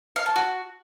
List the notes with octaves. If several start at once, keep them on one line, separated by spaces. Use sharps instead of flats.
F5
A5
F#4